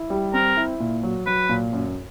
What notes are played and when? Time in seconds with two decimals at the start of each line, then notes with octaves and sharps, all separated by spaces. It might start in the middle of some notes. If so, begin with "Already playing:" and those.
Already playing: E4
0.10 G3
0.34 C4 A#4
0.57 E4
0.80 A#2
1.03 F#3
1.27 F#3 B4
1.49 A#2
1.73 F#2